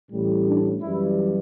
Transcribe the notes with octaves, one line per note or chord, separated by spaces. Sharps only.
A1 A2 G3
D4
F#2 E3 G3 E4